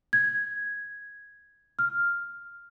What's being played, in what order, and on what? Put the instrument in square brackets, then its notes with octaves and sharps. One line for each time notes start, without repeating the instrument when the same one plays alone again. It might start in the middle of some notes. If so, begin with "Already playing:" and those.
[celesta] G#6
F6